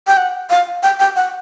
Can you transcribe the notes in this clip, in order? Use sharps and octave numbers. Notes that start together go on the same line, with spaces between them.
G5
F#5
F5
G5
G5
F#5